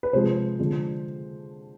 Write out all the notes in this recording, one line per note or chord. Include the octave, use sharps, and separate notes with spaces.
B4
C3 F3 G#3 C5
D3 F3 G#3